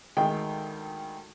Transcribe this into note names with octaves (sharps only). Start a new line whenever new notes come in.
D2 D#3 G#3 G5